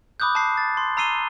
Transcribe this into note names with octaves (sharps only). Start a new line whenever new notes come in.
B5 D6 D#6 F#6 G6
A5 C7
A6
C6
A#5 E6 C7 D#7 G7